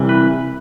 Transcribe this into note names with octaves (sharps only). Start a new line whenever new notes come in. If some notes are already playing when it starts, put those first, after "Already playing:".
Already playing: C2 C3 E3
B4